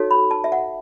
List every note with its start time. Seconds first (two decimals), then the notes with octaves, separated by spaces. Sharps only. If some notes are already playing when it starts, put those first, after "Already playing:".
Already playing: D#4 F#4 A4 C#5
0.11 B5
0.31 A5
0.44 E5
0.52 F#5